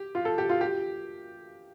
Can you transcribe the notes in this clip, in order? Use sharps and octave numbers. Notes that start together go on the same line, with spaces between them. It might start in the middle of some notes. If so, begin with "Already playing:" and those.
Already playing: G4
F4
A4
G4
F4
G4